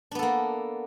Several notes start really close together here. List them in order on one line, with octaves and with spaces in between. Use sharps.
D4 B3 A4 A#3